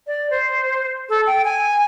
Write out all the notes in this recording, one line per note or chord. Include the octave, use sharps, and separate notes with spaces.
D5
C5
A4
G5
G#5